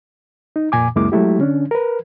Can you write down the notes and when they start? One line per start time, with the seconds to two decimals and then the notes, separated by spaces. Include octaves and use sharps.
0.56 D#4
0.72 F2 A#2 G#5 D6
0.96 C#2 F#2 G#3 A#3 E4 D6
1.12 F#3 G#3 A3 E4 G4
1.39 D3 C#4 D4
1.71 A#4 B4